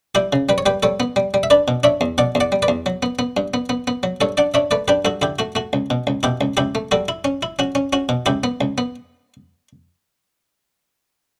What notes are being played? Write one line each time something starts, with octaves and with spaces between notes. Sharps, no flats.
G3 E4 G4
C#3
G3 B4
C#5
G3 G4 B4
G3 A4 C#5
B3
G3
G3
E5
D4 B4 D5
B2
D4 C#5 E5
E2
B2 D5 F#5
E2
D5 F#5
G3
B4 D5
E2
F#3
B3
B3
G2
B3
B3
B3
F#3
G2 A4 C#5
D4 D5 F#5
D4 C#5 E5
A3 B4 D5
D4 G4 B4
G2 F#4 A4
D3 E4 G4
A3 F#4
A3 F#4
C#2
B2
C#2
B2 E4 G4
C#2
C#2 E4 G4
A3
G3 F#4 A4
E4
C#4
E4
C#4 F#4
C#4
C#4 F#4
B2
C#2 E4 G4
B3
C#2
B3